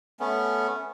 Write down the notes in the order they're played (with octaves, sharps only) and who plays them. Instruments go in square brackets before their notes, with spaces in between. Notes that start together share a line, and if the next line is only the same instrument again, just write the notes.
[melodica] A3 B3 C#4